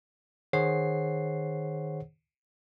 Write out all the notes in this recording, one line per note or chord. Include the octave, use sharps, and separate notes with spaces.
D#3 G#4 C5 C#5 F#5 C7